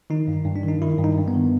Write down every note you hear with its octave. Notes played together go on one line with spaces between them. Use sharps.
D#3 D#4
G2
G2
D4
D#3 D#4
D#3 E4
G2
D#4
G2
B3
D#3